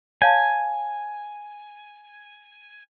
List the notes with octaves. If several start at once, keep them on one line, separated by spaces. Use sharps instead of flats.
C#5 F5 G#5 A5